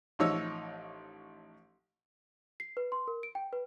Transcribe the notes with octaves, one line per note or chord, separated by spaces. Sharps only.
A1 F3 D#4 C#5 E6
C7
B4
C6
A#4
D7
G5
B4